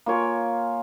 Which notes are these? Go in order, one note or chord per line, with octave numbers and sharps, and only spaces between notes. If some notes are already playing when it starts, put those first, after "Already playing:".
A#3 F4 C#5 G#5